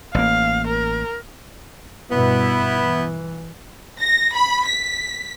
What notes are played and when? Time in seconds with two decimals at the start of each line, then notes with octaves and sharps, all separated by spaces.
0.15 A1 A#3 F5
0.67 A#4
2.11 G2 B2 B3 E4
2.76 E3
4.00 A#6
4.35 B5
4.65 B6